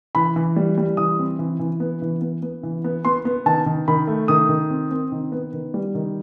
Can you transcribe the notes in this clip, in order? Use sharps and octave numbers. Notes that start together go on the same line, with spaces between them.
E3 B5
E3
G3
G3
E3 D#6
C4
E3
E3
B3
E3
B3
B3
E3
B3
B3 C6
B3
D#3 A5
D#3
D#3 B5
A3
D#3 D#6
D#3
C4
C4
D#3
B3
D#3
G3
D#3